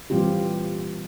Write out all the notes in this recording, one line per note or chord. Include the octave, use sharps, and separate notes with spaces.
A#2 E3 G3 C4 F4 G4